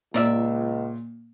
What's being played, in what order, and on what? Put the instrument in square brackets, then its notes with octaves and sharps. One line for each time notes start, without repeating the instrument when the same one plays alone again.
[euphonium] C#2 [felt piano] A#2 [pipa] A#4 D5 E5